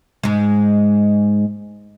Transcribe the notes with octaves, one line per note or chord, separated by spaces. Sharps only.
G#2 G#3